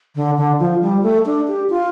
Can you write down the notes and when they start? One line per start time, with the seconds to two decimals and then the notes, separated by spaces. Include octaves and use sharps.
0.16 D3
0.37 D3
0.60 F3
0.82 G3
1.03 A3
1.26 D4
1.48 G4
1.70 F4